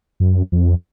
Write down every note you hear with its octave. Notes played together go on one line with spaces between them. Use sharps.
F#2
F2